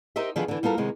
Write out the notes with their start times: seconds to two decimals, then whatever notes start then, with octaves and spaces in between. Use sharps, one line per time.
0.16 D#4 G4 A#4 C5 D#5 E5
0.36 D3 D#3 F3 B3 G#4 B4
0.48 D3 E3
0.63 G3 B3 F4 A4 A#4
0.78 C3 D#3 G#3 B3